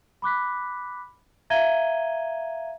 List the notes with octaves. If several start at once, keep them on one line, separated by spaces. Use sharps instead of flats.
B5 D6 F#6 B6
E5 F5 A#5 G#6 D#7 G7